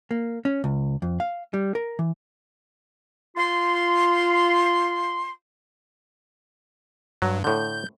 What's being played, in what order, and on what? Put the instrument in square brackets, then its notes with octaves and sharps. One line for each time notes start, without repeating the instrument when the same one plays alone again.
[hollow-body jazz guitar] A#3
C#4
C#2
F2
F5
G3
A#4
E3
[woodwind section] F4 C6
[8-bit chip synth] G2 [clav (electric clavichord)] F#3
[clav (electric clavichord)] A2 D3 [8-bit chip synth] G6